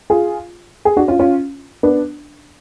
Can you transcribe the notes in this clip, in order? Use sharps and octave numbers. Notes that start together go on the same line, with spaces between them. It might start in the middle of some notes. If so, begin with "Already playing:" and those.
F4 G#4
G#4
D4 F#4
C#4 F4
C#4 F4
B3 D4